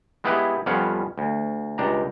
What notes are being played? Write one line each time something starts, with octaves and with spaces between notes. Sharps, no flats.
G#3 B3 E4 G4 G#4 B4
F2 G3 B3 C#4 F5 F#5
D2
C#2 D4 G4 A#5